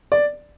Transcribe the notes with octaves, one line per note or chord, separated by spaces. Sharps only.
D5